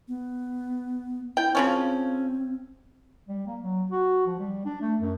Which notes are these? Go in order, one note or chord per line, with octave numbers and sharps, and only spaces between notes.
B3
E4 G5
C#3 F3 C4 C#4
G3
A#3
F#3
F#4
F3
G3
D4
A3
F#2